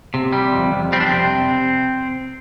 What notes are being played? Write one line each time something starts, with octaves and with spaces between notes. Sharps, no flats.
C3
G3
F2
F2
G3 C4
D4
C4
C3